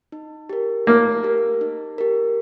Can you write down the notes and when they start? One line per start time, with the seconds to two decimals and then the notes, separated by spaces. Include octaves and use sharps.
0.12 D#4
0.49 G4 A#4
0.87 A#3 D#4
1.23 G4 A#4
1.61 D#4
1.98 G4 A#4